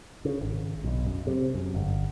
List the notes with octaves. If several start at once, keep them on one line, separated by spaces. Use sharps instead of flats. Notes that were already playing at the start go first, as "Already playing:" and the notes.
C#3
G#1
B1
F#2
C3
F#2
G1